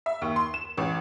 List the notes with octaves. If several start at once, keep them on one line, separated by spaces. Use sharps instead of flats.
E5
D#2
C6
E7
A1